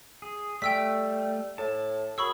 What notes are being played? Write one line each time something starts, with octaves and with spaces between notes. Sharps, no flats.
G#4
G3 A3 G5 E6 B6
A2 A5
F#2 G#4 B5 C#6 E6